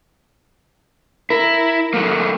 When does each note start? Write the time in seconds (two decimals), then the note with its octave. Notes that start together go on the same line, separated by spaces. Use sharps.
1.30 E4 A#4
1.94 F#3 A3 A#3